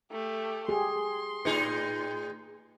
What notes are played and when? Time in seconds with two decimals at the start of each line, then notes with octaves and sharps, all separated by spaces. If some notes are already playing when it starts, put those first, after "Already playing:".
0.11 A3 G4
0.69 G4 G#4 C6
1.45 A2 D#4 G#4 B4